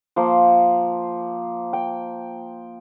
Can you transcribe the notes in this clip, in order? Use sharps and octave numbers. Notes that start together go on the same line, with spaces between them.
F3 A#3 C5
G5